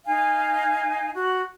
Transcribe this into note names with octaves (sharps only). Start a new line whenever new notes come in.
D#4 F5 G#5
F#4